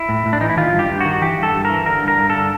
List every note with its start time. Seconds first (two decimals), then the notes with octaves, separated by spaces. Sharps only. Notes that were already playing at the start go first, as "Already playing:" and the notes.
Already playing: E4
0.09 A2
0.26 A2
0.33 D4
0.41 E3 D#4
0.50 E4
0.57 D#3 F4
0.73 G2
0.79 G4
0.90 G2
1.01 D#3 F#4
1.22 E3 G4
1.38 G2 A4
1.53 G2
1.65 A#4
1.70 E3
1.86 D3 A#4
2.03 G2
2.08 A#4
2.18 G2
2.30 D3 A4